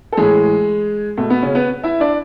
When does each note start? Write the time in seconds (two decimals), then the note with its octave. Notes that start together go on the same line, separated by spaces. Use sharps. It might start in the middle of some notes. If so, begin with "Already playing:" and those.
0.12 A4
0.17 A2 E3 G#3 G#4
1.17 B2 A3
1.30 B3
1.42 C#3 C#4
1.55 B3 B4
1.83 E4 E5
2.00 D4 D5